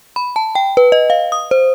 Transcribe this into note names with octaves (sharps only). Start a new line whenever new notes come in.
B5
A5
G5
B4
D#5
F5
D#6
C5